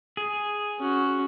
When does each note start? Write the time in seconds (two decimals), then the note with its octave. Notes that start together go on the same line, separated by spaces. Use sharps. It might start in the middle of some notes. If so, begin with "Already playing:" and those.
0.17 G#4
0.79 C#4 F#4